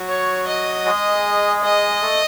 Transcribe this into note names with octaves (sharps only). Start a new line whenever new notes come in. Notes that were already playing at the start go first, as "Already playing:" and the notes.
Already playing: F#3 F#4
C#5
D#5
G#3 G#4
D#5
A3 A4